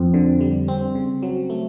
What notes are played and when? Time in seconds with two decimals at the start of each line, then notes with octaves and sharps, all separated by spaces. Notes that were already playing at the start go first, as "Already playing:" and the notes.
Already playing: F2 C4
0.14 D3
0.41 G3
0.68 C4
0.95 C#3
1.23 F#3
1.50 A3